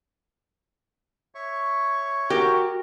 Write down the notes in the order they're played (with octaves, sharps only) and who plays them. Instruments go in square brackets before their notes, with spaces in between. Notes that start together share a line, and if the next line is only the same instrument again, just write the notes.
[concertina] C#5 E5 C#6
[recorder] F#4 [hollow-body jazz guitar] G4 [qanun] A#4